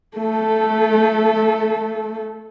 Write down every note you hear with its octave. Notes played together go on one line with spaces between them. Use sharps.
A3 A4